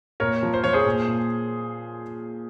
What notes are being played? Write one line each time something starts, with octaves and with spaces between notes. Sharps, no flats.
A#2 A#4 C#5
F3
C5
F3 C#5
G#4 C5
A#2
A#2